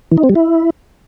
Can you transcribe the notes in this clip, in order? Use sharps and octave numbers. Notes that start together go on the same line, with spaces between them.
E3
D#4
C4
G3
E4